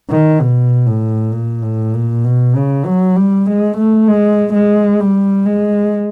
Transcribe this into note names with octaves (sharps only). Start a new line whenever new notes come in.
D#3
B2
A2
A#2
A2
A#2
B2
C#3
F#3
G3
G#3
A3
G#3
G#3
G3
G#3